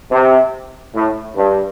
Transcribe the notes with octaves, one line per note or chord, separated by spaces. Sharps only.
C3
A2
G2